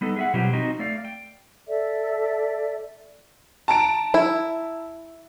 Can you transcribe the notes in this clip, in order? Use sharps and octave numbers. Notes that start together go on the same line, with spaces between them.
G3 B3 D#4 A4
G#4 E5 F#5
B2 F#3 G3 C4 F4 G4
C4 D#4 F#4 D#5
A3 D5 F5
G5
A4 D5 E5
A5 A#5 D7
E4